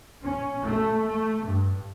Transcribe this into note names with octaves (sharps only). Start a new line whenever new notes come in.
C#4
A3
A3
G2